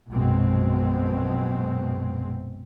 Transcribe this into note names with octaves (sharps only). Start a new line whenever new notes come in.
A#1 F#2 B2 G#3 C4